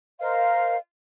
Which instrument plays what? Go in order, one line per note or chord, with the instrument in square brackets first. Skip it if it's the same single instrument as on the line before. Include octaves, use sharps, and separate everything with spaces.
[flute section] A#4 C5 D#5 F5